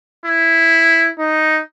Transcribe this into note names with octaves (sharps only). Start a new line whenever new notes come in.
E4
D#4